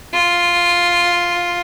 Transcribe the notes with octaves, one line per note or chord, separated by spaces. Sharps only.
F4